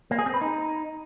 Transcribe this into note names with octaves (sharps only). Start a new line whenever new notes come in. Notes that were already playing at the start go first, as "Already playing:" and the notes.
A#3
G#4
C4
B4
D#4